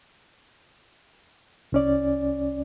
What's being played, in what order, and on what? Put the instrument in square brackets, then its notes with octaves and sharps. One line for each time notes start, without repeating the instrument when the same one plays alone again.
[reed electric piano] C2 C#4 D5